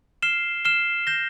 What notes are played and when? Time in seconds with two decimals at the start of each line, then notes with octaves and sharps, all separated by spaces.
0.22 F6 C7 E7 G7
0.65 F6 C7 E7 G7
1.07 G6 A#6 E7 G7